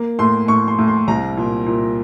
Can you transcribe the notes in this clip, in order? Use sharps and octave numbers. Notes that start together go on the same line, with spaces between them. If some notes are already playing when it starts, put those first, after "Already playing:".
Already playing: A#3
A2 C6
A2 C#6
C6
A2
C6
C2 A#5
A#2
A#2